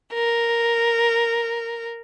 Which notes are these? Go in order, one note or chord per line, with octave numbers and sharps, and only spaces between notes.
A#4